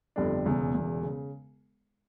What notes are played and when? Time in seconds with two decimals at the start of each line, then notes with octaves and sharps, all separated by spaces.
0.16 G1 F2 D3 G3 D4
0.45 E1 E2 C#3
0.74 E1 E2 C#3
1.03 C#3